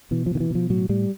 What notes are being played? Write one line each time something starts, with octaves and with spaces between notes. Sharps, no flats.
B2 E3
F3
B2 D#3
E3
B2 F3
A2 F#3
A2 G3